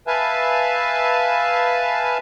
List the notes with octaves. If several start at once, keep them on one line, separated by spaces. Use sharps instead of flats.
B4 E5 F5 G#5 A5